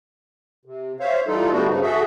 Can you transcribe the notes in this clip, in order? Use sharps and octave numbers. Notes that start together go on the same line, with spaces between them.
C3
C5 C#5 E5 F5
E3 G3 D#4 F4 A4
D3 G3 A3 B3 D4 F#4
G2 C#3 F3 D#4
F#4 G#4 A4 E5